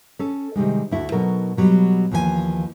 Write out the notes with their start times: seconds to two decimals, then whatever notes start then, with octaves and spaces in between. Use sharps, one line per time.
0.19 C#4 A4
0.55 C3 D#3 G3 G#3
0.91 D2 E4 F#4 A4
1.12 B2 F#3 D#4 A4 A#4
1.57 B2 F#3 G3
2.11 D#2 E3 F3 G#4 G#5